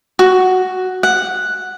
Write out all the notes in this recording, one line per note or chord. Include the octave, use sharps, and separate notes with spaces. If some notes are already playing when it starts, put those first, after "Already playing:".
F#4
F#5